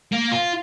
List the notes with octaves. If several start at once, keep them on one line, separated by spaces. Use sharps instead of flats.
A#3
F4